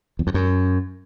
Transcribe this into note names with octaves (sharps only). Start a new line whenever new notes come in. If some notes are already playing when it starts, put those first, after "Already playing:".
E2
F2
F#2